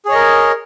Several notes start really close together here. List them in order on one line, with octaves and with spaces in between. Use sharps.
G#4 C#5 D#5 A#4